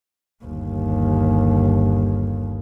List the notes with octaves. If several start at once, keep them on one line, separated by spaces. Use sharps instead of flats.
G1 D#2